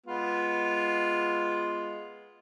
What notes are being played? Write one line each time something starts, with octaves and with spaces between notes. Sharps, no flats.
G#3 B3 F4